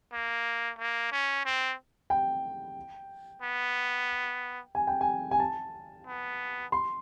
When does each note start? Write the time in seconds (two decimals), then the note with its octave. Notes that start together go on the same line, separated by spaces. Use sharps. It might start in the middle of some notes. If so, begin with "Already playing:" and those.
0.12 A#3
0.79 A#3
1.11 C#4
1.45 C4
2.10 G5
3.42 B3
4.75 G#5
4.87 G5
5.01 G#5
5.31 G#5
5.40 A5
6.07 B3
6.72 C6